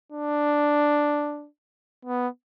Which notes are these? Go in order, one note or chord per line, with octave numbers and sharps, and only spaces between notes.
D4
B3